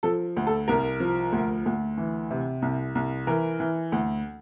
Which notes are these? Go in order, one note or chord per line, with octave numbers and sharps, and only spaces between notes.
F3 A4
D2
A4
C2 A#4
F3
D2
D2
E3
C3
C2
C2
E3 A#4
E3
D2